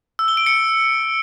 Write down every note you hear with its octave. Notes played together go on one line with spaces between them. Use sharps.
E6
G7
D7
C#7